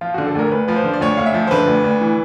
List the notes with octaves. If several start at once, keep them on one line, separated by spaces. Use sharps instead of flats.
F3 F4
D3 F#4
A4
D2 A#4
D2 B4
F3 B4
C5
D3
D5
D2 C#5
D2 F5
E5
F3
C5
D3 B4
D2
D2
E3